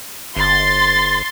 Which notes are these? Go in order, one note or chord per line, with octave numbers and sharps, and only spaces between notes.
G1 C6 A6